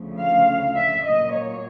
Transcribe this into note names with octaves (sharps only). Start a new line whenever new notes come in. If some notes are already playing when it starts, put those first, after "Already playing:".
Already playing: D2 C#3 F3 A3
F5
E5
A#2 F#3 A#3 D#5
C#5